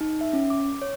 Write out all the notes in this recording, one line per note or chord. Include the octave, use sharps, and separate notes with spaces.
D#4
E5
C#4
D6
C#5